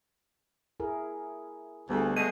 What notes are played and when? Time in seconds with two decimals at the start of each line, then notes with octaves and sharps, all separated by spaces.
0.80 E4 G#4 A#4
1.90 D2 G3 B3 G#4
2.17 B2 G#3 A3 D#7